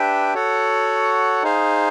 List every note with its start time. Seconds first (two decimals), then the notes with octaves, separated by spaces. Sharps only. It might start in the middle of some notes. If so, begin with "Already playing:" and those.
Already playing: D4 G4 B4 E5 G5
0.34 F#4 A4 C#5 F#5
1.43 D#4 G#4 C5 F5